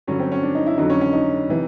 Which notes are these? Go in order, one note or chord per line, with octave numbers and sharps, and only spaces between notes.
G2 D3 F#3 C#4
C4
C#4
D4
D#4
E4
F2 D3 F#3 D#4
C#4
C#4
D#4
C3 E3